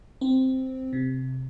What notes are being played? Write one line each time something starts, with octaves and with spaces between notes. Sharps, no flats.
C4
C3